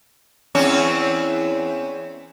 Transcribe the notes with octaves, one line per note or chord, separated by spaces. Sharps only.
E2 C4 C#4